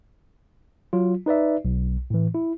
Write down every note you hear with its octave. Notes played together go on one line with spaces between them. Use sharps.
F#3 F4
D#4 B4 D5 E5
B1
A2 E3
E4